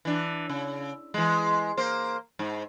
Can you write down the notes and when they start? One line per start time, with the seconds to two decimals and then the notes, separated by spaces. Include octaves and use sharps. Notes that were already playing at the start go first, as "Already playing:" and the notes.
0.05 E3 D4
0.49 C#3
1.14 E3 G#3
1.77 A#3 C5
2.39 G#2